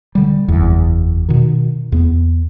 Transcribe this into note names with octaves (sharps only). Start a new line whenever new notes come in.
D3 G3
F#1 E2
B2 D#3
E2 B3